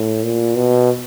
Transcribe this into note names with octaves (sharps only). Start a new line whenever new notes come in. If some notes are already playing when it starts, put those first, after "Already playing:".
Already playing: A2
A#2
B2